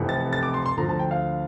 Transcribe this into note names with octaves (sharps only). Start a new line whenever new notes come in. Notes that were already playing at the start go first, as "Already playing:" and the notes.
Already playing: F1 F2 C3 E3
A6
A6
D6
C6
C6
D2 D3 F3 A#5
A5
G5
F5